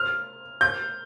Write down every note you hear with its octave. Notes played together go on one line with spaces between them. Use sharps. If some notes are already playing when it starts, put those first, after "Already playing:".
Already playing: F6
G6